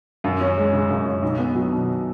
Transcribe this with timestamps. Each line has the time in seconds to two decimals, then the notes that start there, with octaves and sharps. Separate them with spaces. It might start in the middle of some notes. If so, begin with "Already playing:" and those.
0.24 F#2
0.41 C#4
0.57 G#3
0.73 C#3
0.90 F#2
1.06 C#4
1.22 B1
1.38 B3
1.55 F#3
1.71 B2